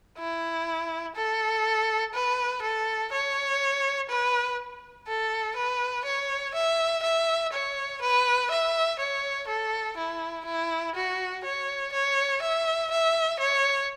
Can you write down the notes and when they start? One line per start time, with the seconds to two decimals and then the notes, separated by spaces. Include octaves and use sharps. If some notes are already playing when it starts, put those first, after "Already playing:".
0.18 E4
1.16 A4
2.14 B4
2.62 A4
3.12 C#5
4.10 B4
5.08 A4
5.56 B4
6.05 C#5
6.55 E5
7.03 E5
7.53 C#5
8.02 B4
8.51 E5
8.99 C#5
9.48 A4
9.97 E4
10.45 E4
10.95 F#4
11.45 C#5
11.93 C#5
12.42 E5
12.91 E5
13.40 C#5